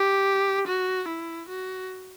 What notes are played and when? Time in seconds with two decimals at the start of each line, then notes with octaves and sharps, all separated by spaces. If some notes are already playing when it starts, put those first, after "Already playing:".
Already playing: G4
0.68 F#4
1.08 E4
1.49 F#4